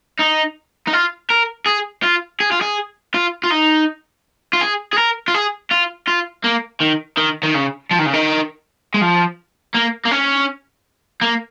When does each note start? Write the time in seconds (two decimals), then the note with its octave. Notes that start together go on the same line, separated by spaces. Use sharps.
0.20 D#4
0.87 D#4
0.93 F4
1.30 A#4
1.67 G#4
2.04 F4
2.40 G#4
2.51 F4
2.61 G#4
3.14 F4
3.44 F4
3.51 D#4
4.53 F4
4.61 G#4
4.93 G#4
4.98 A#4
5.28 F4
5.34 G#4
5.71 F4
6.07 F4
6.44 A#3
6.81 D#3
7.18 D#3
7.43 D#3
7.55 C#3
7.91 F3
7.99 D#3
8.06 C#3
8.13 D#3
8.94 G#3
9.01 F3
9.75 A#3
10.05 A#3
10.11 C#4
11.22 A#3